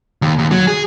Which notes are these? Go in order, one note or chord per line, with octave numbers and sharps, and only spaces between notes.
D#2
D#2
F#3
G#4